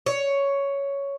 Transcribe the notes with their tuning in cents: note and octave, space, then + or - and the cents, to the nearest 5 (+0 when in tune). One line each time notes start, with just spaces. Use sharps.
C#5 +5